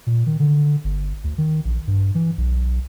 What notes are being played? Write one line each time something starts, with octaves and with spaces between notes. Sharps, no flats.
A#2
D#3
D3
G1
D2
D#3
A#1
G2
E3
B1